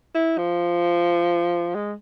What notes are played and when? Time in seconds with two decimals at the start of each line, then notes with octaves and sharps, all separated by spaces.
0.15 E4
0.38 F3
1.75 G#3